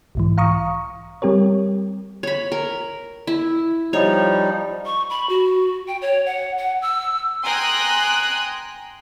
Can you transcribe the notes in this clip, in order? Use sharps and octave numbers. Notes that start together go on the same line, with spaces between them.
B1 G#2 E3
F5 A#5 C#6 D#6
G3 C4 G4 A#4 C#5
C#5 B5
A#4
E4
F3 G3 D#4 C#5
C#6
B5
F#4
G5
C#5
F#5
F#5
E6
G5 G#5 A#5 C6 D#6 F#6